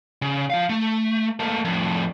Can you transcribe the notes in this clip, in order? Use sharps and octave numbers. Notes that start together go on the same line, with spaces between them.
C#3
F3 F5
A3
A3 A#3
F2 A2